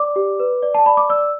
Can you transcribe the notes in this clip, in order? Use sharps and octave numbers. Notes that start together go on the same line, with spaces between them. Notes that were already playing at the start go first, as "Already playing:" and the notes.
Already playing: D5 D6
G4
B4
D5
A5
D5 B5
D6
D5 E6